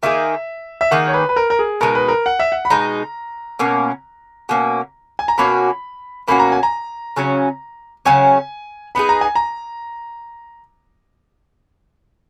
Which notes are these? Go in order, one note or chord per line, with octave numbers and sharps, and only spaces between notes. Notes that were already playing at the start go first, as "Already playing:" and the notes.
D#3 A#3 D#4 G#4 E5
E5
D#3 A#3 D#4 G#4 F#5
C#5
B4
B4
A#4
A#4
G#4
B2 G#3 D#4 A#4
B4
A#4
F#5
E5
F#5
B5
B2 G#3 D#4 A#5
B2 A#3 C#4
B2 A#3 C#4
G#5
A#5
B2 A#3 C#4 F#4 B5
B2 A#3 C#4 F#4 B5
A#5
G#5
A#5
C#3 F#3 C#4
C#3 F#3 C#4 G#5
B3 D#4 G#4 B5
A#5
G#5
A#5